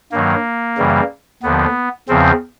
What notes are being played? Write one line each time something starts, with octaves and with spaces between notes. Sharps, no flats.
G2 D#3 F#3 A#3
F#2 C#3 E3 G3
D#2 D3 F3 B3
E2 C#3 F3 C4